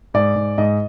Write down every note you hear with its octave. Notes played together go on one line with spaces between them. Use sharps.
G#2 D5
G#2
G#2 D#5